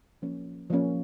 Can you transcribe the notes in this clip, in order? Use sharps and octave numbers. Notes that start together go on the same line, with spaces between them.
F3 A#3 C#4
F3 A#3 C#4